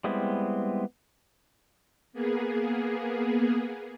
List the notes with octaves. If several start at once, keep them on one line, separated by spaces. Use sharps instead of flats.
G3 G#3 B3 C4 E4
A#3 B3 G#4